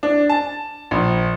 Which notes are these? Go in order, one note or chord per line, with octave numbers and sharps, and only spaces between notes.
D4
A5
A#1